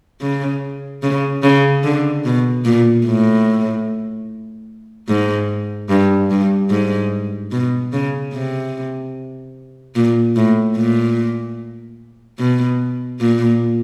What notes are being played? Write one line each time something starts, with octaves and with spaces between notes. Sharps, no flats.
C#3
C#3
C#3
D3
B2
A#2
A2
G#2
G2
G2
G#2
B2
C#3
C3
A#2
A2
A#2
B2
A#2